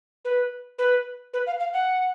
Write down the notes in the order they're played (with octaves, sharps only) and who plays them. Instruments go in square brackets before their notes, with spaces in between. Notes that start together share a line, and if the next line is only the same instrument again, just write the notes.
[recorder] B4
B4
B4
F5
F5
F#5